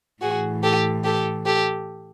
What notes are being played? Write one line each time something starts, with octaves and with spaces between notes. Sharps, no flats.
A2 E3 F#4 G#4
G4 A4
G4 A4
G4 A4